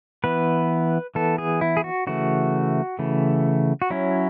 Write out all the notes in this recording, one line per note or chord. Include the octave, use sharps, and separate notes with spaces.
E3 B3 B4
E3 B3 A4
G#4
E4
G#4
F#4
C#3 E3 A3 F#4
C#3 E3 A3
F#4
F#3 C#4 E4